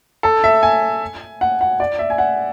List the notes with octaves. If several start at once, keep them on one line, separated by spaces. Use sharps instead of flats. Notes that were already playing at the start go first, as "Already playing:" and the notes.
A4
E5
G#5
F#5
F#5
D5
E5
G#5
F#5